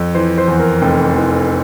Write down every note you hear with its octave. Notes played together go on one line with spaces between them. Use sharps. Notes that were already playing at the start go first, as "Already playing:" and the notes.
Already playing: F2
E3 C5
C5
E2
A#4
F1 G5
E3